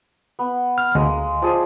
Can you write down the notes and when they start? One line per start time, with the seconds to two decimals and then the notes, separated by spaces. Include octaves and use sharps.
0.39 B3
0.78 F6
0.95 D2 G#3 A#3
1.42 F3 G#4 D5